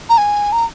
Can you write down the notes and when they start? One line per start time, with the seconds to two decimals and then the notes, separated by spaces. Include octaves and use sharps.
0.09 A#5
0.18 G#5
0.52 A#5